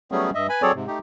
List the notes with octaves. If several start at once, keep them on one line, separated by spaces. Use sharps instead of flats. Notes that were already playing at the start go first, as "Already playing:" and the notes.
F#3 G3 A3 B3 C#4 G#4
G2 D#5 E5
B4 G#5 B5
F#3 C4 G#4 A4 C#5 D5
G#2 C3
A3 D#4 G4